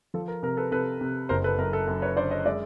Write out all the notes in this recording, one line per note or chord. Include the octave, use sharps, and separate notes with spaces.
F3 A4
A#4
C3 A#4
A4 B4
C3 A4 B4
C3
F#1 A#4 C5
A4 B4
F#2 A#4
A4
F#2
B4 C#5
D3 C5 D5
C#5 D#5
G#3 D5 E5